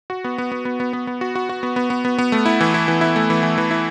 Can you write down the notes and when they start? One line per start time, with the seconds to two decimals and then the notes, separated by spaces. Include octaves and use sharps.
0.10 F#4
0.24 B3
0.38 B3
0.52 B3
0.65 B3
0.80 B3
0.93 B3
1.07 B3
1.21 F#4
1.35 F#4
1.49 F#4
1.63 B3
1.76 B3
1.90 B3
2.05 B3
2.18 B3
2.32 A3
2.46 E4
2.60 E3
2.74 E4
2.88 E3
3.01 E4
3.16 A3
3.30 E3
3.43 E3
3.58 E3
3.71 E4